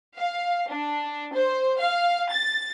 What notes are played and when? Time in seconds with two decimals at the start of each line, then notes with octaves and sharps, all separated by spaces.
0.16 F5
0.69 D4
1.33 C5
1.79 F5
2.32 A6